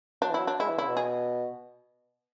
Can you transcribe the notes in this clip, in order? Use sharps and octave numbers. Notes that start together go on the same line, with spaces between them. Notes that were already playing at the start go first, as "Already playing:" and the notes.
F#3 D4
E3
F#3 E4
D4
G#3 E4
E3
C#3 E4
B2
G#4